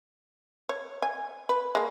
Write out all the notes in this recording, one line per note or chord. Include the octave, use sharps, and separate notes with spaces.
C#5
G#5
B4
G#3 A#3